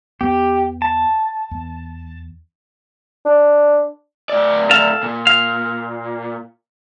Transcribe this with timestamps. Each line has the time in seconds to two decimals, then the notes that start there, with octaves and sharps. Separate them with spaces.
0.21 E2 B3 G4
0.82 A5
1.51 E2
3.26 D4
4.30 A2 D5
4.71 A4 F5
5.03 A#2
5.27 F5